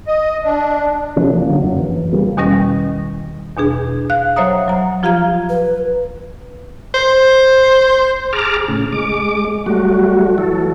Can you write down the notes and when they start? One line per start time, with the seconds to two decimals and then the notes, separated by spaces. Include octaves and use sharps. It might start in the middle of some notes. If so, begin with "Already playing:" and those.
0.07 D#5
0.44 D4
1.16 C3 E3 F3 C#4
1.32 F3 A#3
1.49 D3 F#3 C#4
1.63 F#2 F#3
1.76 F#1 E3
2.12 C#3 F3 G3 A#3
2.37 E2 B2 D#3 G3 C#4 A#6
3.57 E2 B2 D4 G#4
4.10 F5 F#6
4.36 F#3 C5 C#5 E5 A#5 D#6
4.68 F#3 A#5
5.03 F3 F4 G4 F5 A#5 G#6
5.49 B4
6.94 C5
8.33 G#4 A5 A#5 D6 F6
8.68 A2 C#3
8.92 G#3 D6
9.66 F#3 G3 A3 F#4
10.38 E3 F#3 A4